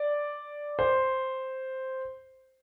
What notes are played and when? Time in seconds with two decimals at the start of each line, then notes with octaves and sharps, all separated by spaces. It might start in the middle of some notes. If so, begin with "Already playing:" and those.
Already playing: D5
0.79 C5